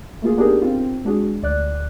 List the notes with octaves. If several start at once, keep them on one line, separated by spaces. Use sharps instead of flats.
A3 A#3 F4 G#4
B3 D4 D#4 G4 G#4 A#4
C4 F4
C4
G#3 D4 F#4 G#4
D2 D5 F#6